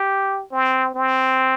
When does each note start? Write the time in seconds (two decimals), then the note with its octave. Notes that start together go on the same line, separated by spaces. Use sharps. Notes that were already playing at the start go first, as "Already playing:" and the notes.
Already playing: G4
0.52 C4
0.95 C4